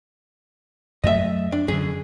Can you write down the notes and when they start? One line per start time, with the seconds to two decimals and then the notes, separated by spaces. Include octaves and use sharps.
1.04 F#2 F#3 A3 D#5 E5
1.52 D4
1.68 F#2 D3 G#4